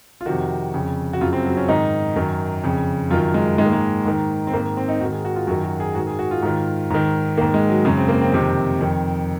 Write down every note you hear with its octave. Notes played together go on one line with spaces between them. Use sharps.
F4
F2 C3 D#3 F#4
F2 C#3
F#4
F#2 C#3 F4
C4
F#3
C#4
G#2 D#3 D#4
F#2 D#3
F2 C#3
F#2 D#3 F4
G#3
G#2 D#3 G#3
A#3
G#3
G#2 D#3
C4
G#2 D#3 A#3
C4
D#4
G#2 D#3 F#4
G#4
F#4
F4
F#2 D#3 F#4
F#4
G#4
G#2 D#3 F#4
G#4
F#4
F4
G#2 D#3
G#2 D#3
G#2 D#3 A#3
G#3
F#3
F#2 C#3 G#3
C4
A#3
C4
F2 C3 D#3
F2 D#3